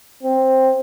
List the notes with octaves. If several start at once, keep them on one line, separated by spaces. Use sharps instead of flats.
C4